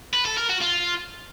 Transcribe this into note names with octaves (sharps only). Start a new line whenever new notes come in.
B4
A4
A#4
F#4
F4